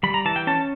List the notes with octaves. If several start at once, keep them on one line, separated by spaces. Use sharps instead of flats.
G3 B5
A#5
E3 A5
G5
C#4 A5